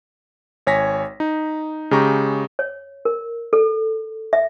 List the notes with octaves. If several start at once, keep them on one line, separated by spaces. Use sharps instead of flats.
G#1 C#5 G#5 A#6 B6
D#4
C#3 G#3 G4 A#5 C#6
C#5
A#4
A4
E5